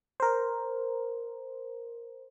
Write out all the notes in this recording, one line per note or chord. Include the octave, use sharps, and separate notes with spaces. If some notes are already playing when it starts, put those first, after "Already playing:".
A#4 C5